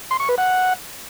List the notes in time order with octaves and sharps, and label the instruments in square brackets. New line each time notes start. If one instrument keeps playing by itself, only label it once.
[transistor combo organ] C6
C#6
B4
F#5